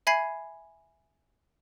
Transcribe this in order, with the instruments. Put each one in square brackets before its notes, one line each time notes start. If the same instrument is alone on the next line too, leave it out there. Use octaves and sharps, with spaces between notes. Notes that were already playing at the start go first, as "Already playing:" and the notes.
[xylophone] E5 G#5 B5 G#6 C7